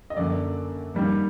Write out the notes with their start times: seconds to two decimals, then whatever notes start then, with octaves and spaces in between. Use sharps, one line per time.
0.10 D#5
0.17 F#2 D3 F#3 A#3 D5
0.95 G2 D#3 G3 A#3